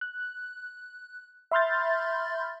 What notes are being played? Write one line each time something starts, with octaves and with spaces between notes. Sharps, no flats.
F#6
E5 B5 C6 F6 G6 A6